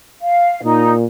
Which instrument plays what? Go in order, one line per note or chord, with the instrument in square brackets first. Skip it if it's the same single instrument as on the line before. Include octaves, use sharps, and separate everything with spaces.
[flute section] F5
[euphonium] A#2 [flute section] D#4